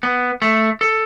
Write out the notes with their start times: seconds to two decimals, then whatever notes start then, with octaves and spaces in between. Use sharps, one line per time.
0.03 B3
0.42 A3
0.81 A4